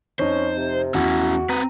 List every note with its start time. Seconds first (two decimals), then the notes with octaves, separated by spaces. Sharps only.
0.19 F2 C#4 D#4 C5
0.57 C3
0.94 E2 C#4 E4 F#4
1.49 C4 B4 A#5 D#7